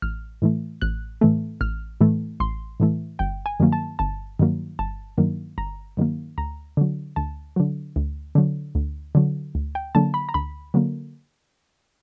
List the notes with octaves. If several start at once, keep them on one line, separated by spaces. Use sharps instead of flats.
A1 F6
A2 E3 A3
A1 F#6
A2 E3 A3
A1 F6
A2 E3 A3
A1 C6
A2 E3 A3
G1 G5
G#5
G2 D#3 F#3 A#3
A5
G1 A5
G2 D#3 F#3 A#3
G1 A5
G2 D#3 F#3 A#3
G1 A#5
G2 D#3 F#3 A#3
D2 A#5
D3 F#3
D2 A5
D3 F#3
D2
D3 F#3
D2
D3 F#3
D2
G5
D3 F#3 A#3 A5
B5
A#5
D2 B5
D3 F#3 A#3